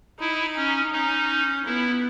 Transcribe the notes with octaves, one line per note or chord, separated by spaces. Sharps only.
D#4 E4
C#4
C#4 D#4
B3 E4